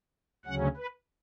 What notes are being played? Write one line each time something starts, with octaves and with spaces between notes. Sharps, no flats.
D2 C#3 F#3 C#4 F#5
B4